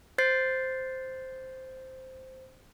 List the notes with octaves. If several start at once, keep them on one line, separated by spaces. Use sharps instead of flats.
C5 G6 A6 C7